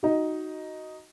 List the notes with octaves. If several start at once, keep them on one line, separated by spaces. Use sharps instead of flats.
D#4 F#4